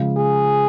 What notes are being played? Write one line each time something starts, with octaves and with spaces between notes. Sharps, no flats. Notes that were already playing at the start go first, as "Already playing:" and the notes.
Already playing: C#3 F3 G#3
G#4